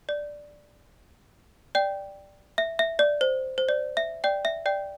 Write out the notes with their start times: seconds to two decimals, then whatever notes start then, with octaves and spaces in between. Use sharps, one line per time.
0.09 D5
1.75 D5 G5
2.58 E5
2.79 E5
2.99 D5
3.21 C5
3.58 C5
3.69 D5
3.97 E5
4.24 D5 G5
4.45 E5
4.66 D5 G5